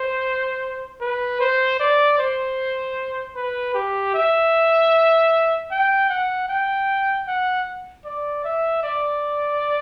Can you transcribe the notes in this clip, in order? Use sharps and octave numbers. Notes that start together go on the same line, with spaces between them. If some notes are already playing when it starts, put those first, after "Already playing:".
Already playing: C5
B4
C5
D5
C5
B4
G4
E5
G5
F#5
G5
F#5
D5
E5
D5